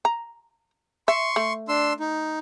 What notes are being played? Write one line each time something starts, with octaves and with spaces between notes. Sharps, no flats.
A#5
E5 C6 C#6
A3
D4 C6 E6
D#4